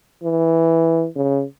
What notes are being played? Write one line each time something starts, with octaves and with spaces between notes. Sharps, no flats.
E3
C#3